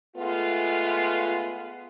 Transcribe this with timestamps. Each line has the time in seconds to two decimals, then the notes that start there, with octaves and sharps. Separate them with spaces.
0.17 G#3 A3 B3 F4